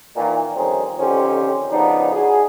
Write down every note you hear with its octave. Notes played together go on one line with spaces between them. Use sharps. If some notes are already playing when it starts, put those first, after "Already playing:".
A#2 D#3 E3
F2 D#3 G3 C4 C#4 D#4
F2 D3 D#3 C#4 G4 C5
C#3 F3 B3 D4 D#4
F#4 G#4